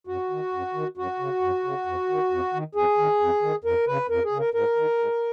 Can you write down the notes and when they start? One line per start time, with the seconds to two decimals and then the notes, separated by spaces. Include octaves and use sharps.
0.07 F#2 F#4
0.30 D#3
0.53 F#2
0.74 D#3
0.97 F#2 F#4
1.19 C#3
1.41 F#2
1.64 C#3
1.86 F2
2.09 D#3
2.31 F2
2.54 D#3
2.75 F2 G#4
2.98 D#3
3.20 F2
3.42 D#3
3.64 F2 A#4
3.87 C#3 B4
4.10 F2 A#4
4.24 G#4
4.32 C#3
4.39 A#4
4.54 G#2 A#4
4.76 D#3
4.98 G#2